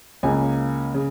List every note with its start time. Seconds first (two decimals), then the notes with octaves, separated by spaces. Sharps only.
0.23 C#2 C#3 A#3 G#5
0.94 C#3